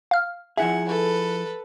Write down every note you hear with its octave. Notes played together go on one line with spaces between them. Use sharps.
F5 F6
F3 E4 G#4 E5 F#5
A4 B4